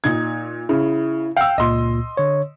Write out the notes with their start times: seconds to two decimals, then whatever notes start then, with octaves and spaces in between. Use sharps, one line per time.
0.04 A#2 D#4 G#6
0.69 C#3 E4
1.37 F5 G5 E6
1.58 C#2 A#2 D#5 C6
2.17 D3 C#5